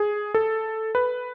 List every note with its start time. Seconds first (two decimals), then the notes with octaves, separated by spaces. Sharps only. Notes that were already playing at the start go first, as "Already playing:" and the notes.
Already playing: G#4
0.34 A4
0.95 B4